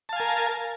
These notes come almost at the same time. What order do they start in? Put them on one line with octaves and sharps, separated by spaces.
A5 F5 G#5 A#4